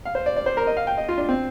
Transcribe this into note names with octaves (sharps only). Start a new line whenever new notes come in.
F5
C5
D5
D5
C5
A#4
D#5
F5
G5
D#5
F4
D4
C4